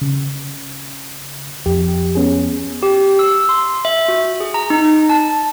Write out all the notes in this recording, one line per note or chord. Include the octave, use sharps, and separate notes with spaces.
C#3
F2 G4
B3 C#4 G#4
G4
E6
C6
E5
F#4
G#4
A#5
D#4
A5